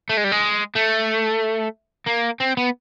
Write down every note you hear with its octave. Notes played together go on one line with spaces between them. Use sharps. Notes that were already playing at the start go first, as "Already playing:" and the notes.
A3
G#3
G3
G#3
A3
A#3
C4
B3